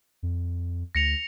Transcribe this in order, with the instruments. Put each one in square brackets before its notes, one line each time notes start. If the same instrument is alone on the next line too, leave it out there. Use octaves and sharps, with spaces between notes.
[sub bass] F2
[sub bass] D2 [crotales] A#6 C#7 F7